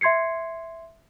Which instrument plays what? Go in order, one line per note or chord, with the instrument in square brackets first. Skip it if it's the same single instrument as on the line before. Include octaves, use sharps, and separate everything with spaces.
[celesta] E5 C6 G#6 C7 C#7